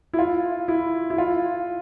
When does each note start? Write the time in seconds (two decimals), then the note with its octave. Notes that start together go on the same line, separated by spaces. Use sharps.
0.13 E4
0.19 F4
0.68 E4
1.10 E4
1.18 F4